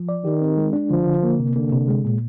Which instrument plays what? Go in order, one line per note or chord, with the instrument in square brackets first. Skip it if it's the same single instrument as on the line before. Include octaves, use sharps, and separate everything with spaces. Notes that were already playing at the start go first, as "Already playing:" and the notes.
Already playing: [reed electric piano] F3
D5
[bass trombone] D#3 [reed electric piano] G4
[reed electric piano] C4
G#3
D4
[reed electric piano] D3 [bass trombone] F3
[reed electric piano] D3
A#3
C3
[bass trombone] D3 [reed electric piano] A#3
[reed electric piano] C3
G#3
A#2